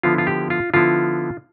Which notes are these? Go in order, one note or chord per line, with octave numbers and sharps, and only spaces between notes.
D3 F3 B3 E4 F4
F4
G4
F4
D3 F3 B3 E4 F4